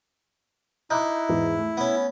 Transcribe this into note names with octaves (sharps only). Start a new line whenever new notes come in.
D#4 E4 D6 F#6 G6
E2 G#2 E3
A3
B3 C#4